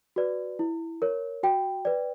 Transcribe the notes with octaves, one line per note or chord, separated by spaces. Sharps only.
F#4 B4 D5
E4
A#4 C#5
F#4 G5
B4 D5